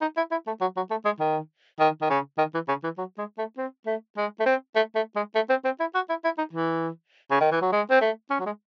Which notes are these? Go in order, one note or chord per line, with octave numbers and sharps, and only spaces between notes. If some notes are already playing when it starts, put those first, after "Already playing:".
D#4
E4
E4
A3
F#3
F#3
A3
G#3
D#3
D#3
D#3
C#3
D#3
E3
C#3
E3
F#3
G#3
A3
C4
A3
G#3
A3
C4
A3
A3
G#3
A3
C4
C4
E4
F#4
E4
E4
D#4
E3
C#3
D#3
E3
F#3
G#3
C4
A3
C#4
F#3
G#3